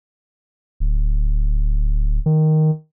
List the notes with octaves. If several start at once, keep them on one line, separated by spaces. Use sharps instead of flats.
D1
D#3